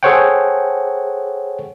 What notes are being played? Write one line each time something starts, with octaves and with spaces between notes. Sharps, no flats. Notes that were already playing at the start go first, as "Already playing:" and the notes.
G#4 A4 C5 C#5 F#5 G5